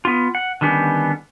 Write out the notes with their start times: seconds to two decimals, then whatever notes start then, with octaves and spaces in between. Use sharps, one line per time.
0.05 B3 F4
0.35 F#5
0.61 D3 D#3 G3 B3 C#4